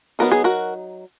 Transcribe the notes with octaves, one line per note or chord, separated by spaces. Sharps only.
F#3 B3 D#4 A#4
G#4
F#4 A#4